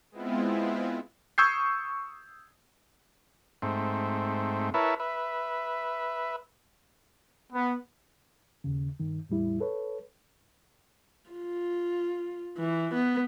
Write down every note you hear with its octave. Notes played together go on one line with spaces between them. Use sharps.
G#3 B3 C4 E4 F4
C#6 D#6 E6 G6 G#6 C7
G#2 A3 C4
E4 A#4 B4 C#5 E5 A5
B4 E5
B3
D#2 C#3
G2 D#3
E2 A2 G3 E4
A4 B4 C#5
F4
E3
B3